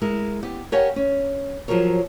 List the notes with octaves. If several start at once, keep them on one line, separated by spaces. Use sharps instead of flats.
G#3 E4 A#4
B3 G4
G4 A#4 C#5 F5 F#5 G#5
C#4
F3 F#3 G#4 A#4 C#5